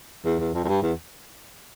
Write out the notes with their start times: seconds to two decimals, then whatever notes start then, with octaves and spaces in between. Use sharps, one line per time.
0.25 E2
0.39 E2
0.54 F2
0.64 F2
0.68 G2
0.83 E2